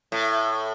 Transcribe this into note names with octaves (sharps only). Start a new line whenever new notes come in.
A2